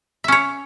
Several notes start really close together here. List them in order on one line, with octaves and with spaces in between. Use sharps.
E5 C#4 C#5